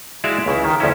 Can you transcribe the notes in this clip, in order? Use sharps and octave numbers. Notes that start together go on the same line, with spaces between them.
G#3 E4 F#4 D5 E5 F5
C#2 C#3 E4
D#3
D2 F3 C#4 E4